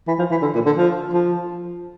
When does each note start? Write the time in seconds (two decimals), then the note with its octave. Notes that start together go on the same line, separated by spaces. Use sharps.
0.07 E3
0.19 F3
0.31 E3
0.42 D3
0.55 A#2
0.66 D3
0.77 F3
1.13 F3